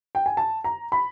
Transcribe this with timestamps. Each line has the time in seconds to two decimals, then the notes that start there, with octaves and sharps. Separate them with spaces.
0.15 G5
0.26 G#5
0.37 A5
0.64 A#5
0.92 B5